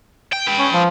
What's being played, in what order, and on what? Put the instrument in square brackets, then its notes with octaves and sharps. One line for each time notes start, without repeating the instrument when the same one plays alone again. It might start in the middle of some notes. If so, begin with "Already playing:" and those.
[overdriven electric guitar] G5
B4 G5
[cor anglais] C#4
F3